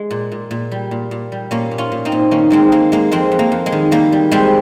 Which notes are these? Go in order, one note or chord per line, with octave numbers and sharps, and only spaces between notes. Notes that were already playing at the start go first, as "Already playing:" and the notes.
Already playing: G#3
A#2
A#2
A#2
G3
A#2
A#2
G3
A#2 A#3 C#4
A#2
C#4 F4
A#2
C4 D#4
A#2
D#3 A#3 C#4
D#3 G#3 C4
G#3 A#3
G#3 A#3
F2 G#3 C4
F2
A#3
F2
G#3
D#3
G3 A#3
G3
G3 G#3 C4